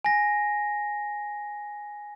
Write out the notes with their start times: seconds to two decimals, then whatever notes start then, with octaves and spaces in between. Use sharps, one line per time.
0.04 G#5 A#6